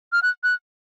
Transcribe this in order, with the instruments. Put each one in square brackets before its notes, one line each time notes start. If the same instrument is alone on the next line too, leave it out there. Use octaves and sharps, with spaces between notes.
[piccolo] F6
F#6
F#6